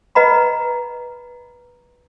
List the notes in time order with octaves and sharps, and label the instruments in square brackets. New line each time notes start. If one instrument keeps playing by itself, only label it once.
[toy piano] B4 D#5 F#5 A#5 B5